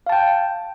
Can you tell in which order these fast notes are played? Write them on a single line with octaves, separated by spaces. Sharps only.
F5 A5 G5